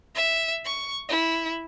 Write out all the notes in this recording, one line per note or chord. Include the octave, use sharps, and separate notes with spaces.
E5
C#6
E4